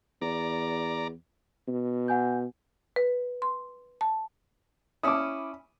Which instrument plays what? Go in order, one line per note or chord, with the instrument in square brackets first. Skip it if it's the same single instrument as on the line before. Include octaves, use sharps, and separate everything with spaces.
[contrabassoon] E2 [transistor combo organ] D5 A#5
[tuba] B2
[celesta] F#5 G#5 G6
[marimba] B4
C6
A5
[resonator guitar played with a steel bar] C#4 E4 [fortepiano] D6 D#6